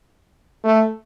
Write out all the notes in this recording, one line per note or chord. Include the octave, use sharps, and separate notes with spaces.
A3